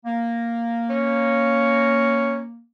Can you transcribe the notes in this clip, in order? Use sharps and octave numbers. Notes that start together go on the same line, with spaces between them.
A#3
C#4